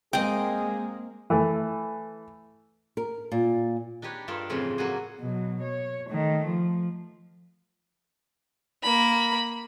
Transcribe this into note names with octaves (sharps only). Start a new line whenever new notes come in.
G#3 A#3 C4 G#4 D#5 G5
E3 A3
A#4
A#2
D4 D#4 G4 B4 C#5
G2 F4 A4 A#4 D5
F2 A2 C#3 E3 F4
F#3 A#3 F4 F#4 G#4
B2 F#3
C#5
D#3 A3
F3
A#3 B5